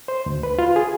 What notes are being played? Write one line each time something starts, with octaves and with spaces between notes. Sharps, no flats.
C5
D2
B4
F4
G#4